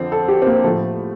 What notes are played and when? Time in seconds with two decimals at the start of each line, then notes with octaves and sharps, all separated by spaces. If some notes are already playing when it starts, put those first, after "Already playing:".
Already playing: F2 D3 F3 C4
0.12 A4
0.29 G4
0.42 C4
0.47 A#3
0.64 A2 F3 A3